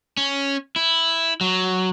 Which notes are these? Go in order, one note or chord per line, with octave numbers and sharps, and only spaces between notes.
C#4
E4
F#3